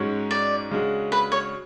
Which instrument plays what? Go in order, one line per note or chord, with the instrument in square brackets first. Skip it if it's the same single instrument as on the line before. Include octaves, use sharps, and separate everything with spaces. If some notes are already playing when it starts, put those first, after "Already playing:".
Already playing: [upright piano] G#2 G#3 C#4 F#4 C#5
[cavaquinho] D5
[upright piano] C#3 G#3 D4 F#4
[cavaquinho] B4
C#5